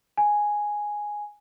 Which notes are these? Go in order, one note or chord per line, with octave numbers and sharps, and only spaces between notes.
G#5